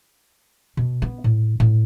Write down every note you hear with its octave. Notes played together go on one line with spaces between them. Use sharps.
B2
B3
A2
A2